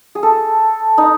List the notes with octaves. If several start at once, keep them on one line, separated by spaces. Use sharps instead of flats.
G#4
A4
D#4